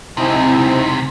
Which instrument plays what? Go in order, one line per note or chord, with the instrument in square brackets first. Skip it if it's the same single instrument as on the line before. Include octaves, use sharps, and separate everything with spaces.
[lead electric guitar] C#2 C3 [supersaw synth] C4 D#4 E4